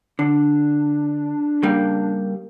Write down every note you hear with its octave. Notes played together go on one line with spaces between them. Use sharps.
D3 D4
C#3 G3 A#3